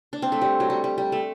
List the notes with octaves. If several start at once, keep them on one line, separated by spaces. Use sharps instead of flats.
D4
C4
A3
G3
F#3
G3
G3
G3
A3